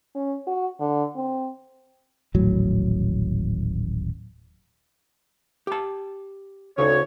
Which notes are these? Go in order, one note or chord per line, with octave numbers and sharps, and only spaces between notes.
C#4
F#4
D3
C4
D#1 A1 A2 F#3
G4 A5
D2 C#3 D#4 C#5